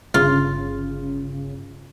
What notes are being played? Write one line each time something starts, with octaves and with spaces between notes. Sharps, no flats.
G1 C#3 F4